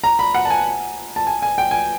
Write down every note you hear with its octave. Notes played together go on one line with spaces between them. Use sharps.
A#5
B5
F#5
A5
G#5
A5
G#5
G#5
G5
G#5